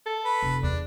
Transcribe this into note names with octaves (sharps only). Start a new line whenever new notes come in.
A4
B4
F1
E2 D4